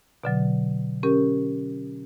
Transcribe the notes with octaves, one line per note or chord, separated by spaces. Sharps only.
B2 D3 F#3
C#4 G4 A#4